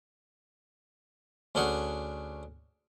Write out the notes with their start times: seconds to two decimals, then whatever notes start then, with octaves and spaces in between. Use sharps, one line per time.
1.55 D2 C#4 D4 G#4 F#5